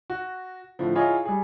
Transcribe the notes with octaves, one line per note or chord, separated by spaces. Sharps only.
F#4
A2 D3 F3
E4 F4 G#4 C#5 D#5
G3 G#4